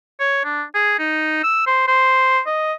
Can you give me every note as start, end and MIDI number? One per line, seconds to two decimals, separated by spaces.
0.20 0.42 73
0.45 0.63 62
0.75 0.96 68
0.99 1.39 63
1.43 1.67 88
1.67 1.86 72
1.88 2.40 72
2.46 2.73 75